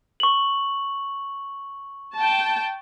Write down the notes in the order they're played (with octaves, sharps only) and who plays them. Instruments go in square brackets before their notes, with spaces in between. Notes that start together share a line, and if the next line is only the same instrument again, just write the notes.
[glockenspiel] C#6 F#7
[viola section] G5 A5